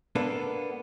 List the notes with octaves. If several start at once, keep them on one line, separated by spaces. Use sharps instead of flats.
A#3 B3 D4 A4